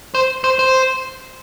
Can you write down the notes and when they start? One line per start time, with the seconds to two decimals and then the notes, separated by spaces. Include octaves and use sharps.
0.15 C5
0.44 C5
0.59 C5